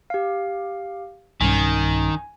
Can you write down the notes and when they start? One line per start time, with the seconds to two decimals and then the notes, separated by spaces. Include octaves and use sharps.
0.10 G4 F5
1.41 B1 G2 D#3 C#4 G#5